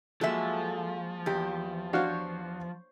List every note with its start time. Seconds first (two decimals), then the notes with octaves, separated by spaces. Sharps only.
0.21 F3 F#3 G#3 A#3 A4 E5
1.26 E2 G4
1.93 D4 F#4 C5 C#5 F5